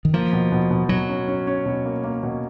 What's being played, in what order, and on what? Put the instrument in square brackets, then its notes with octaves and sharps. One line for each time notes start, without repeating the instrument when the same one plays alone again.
[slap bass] D#3
[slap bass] F3 [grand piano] A#3
[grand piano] B2
B2
B2
[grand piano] B2 [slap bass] F#3
[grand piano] C#4
C#4
C#4
B2
A#3
A#3
B2